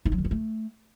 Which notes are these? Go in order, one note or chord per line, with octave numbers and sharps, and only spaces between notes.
D#4
F#3
D#3
B3
A3